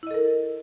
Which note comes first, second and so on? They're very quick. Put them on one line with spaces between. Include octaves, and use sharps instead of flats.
E4 D#5 A4 A#4